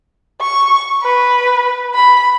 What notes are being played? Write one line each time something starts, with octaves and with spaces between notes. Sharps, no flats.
C#6
B4
B5